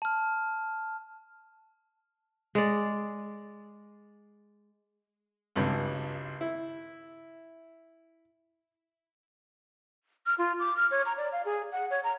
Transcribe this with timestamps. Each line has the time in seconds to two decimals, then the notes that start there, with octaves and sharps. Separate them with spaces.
0.02 A5 F6
2.55 G#3 D5
5.56 G#1 C#2 G2
6.41 E4
10.26 F6
10.38 F4
10.60 D6
10.77 F6
10.91 C#5
11.06 A#5
11.18 D5
11.32 F5
11.45 G#4
11.72 F#5
11.91 C#5
12.04 A#5